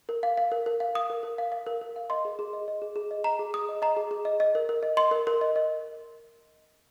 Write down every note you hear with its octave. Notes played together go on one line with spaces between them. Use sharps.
A#4
F5
F5
A#4
A#4
F5
F5 D#6
A#4
A#4
F5
F5
A#4
A#4
F5
D#5 C6
G#4
G#4
D#5
D#5
G#4
G#4
D#5
D#5 A#5
G#4
G#4 D#6
D#5
D#5 A#5
G#4
G#4
D#5
D#5
A#4
A#4
D#5
D#5 C6
A#4
A#4
D#5
D#5